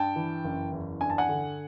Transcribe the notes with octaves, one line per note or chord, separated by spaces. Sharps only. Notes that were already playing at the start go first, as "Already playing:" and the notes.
Already playing: G2 G5 A5
E3
F#1
E2
G2 G#5
A5
F#5 G#5
D3